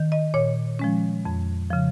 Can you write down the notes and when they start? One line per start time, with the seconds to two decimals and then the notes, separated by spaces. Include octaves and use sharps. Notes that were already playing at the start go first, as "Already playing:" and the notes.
Already playing: D#3
0.12 D#5
0.34 A#2 C#5
0.79 F3 G#3 C#4
1.25 F2
1.70 C#3 F3